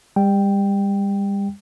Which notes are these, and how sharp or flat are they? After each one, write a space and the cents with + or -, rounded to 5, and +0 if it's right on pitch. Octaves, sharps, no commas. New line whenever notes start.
G3 +35 G5 +0